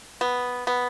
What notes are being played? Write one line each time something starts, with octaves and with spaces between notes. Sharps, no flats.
B3
B3